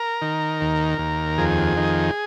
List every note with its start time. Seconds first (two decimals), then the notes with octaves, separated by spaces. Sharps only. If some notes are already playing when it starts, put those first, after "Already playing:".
Already playing: A#4
0.22 D#3
0.61 D#2
0.98 D#2
1.38 F2 G#4
1.77 D#3